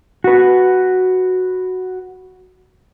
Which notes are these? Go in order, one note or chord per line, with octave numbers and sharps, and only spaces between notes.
F#4 B4